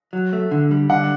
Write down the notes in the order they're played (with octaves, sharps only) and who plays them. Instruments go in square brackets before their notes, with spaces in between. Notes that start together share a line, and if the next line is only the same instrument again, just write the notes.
[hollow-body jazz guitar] F#3
A3
D3
G3
[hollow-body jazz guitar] D3 [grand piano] F#5